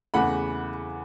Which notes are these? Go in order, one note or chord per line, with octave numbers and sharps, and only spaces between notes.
E2 C#3 E3 A3 F#5 B5